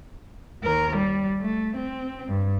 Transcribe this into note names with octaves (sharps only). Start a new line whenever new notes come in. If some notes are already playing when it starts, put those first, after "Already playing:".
D#2 A#4
G3
A3
C4
G2